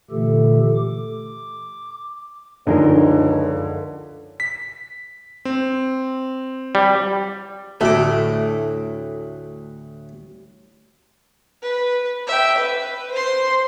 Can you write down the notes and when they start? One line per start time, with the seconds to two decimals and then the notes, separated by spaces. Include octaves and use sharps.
0.11 A#2 D3 E3 A3 G4 A4
0.76 D6
2.67 C#2 F#2 D3 F3 D4 D#4 G#4 A#4
4.40 B6
5.45 C4
6.75 G3
7.81 D2 A2 A3 D6
11.62 B4
12.27 E5 G5
12.58 B4
13.11 C5 C6